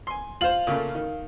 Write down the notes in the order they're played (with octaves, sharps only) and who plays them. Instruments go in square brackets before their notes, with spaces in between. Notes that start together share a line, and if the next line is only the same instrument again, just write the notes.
[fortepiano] G#5 C6
[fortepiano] F4 C5 [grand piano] F5 F#7
[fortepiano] A#2 C#3 A3
D#3